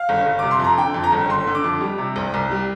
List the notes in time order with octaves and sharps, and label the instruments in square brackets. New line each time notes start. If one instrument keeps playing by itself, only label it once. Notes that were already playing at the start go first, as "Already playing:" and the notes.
Already playing: [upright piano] F5
G1
G1
C3 D6
C6
F2 A#5
D3 G5
F2
A#5
G1
G1 C6
D3
D6
F2
G3
C3
C2
C2
G3